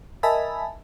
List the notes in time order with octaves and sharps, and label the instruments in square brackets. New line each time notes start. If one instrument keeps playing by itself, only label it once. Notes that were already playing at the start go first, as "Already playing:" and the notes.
[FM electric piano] A#4 D#5 E5 G#5 A5 B5